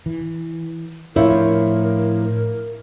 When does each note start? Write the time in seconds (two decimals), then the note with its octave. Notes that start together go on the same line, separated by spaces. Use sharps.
0.06 E3
1.16 A2 F3 D4 E4 A#4 C#5